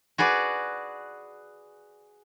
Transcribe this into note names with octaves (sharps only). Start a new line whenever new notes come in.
F#4 G#4 B4 D5